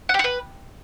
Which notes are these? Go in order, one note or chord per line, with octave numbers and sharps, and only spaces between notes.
F#5
G4
F#5
B4